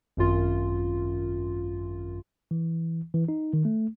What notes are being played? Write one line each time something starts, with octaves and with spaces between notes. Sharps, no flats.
G#1 F#2 F4
E3
E3
D#4
D#3
A3